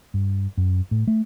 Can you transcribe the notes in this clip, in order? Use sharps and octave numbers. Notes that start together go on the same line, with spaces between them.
G2
F#2
A2
A3